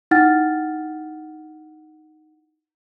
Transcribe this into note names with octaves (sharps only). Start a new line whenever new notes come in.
D#4 E4 F#5 G5 F6 A6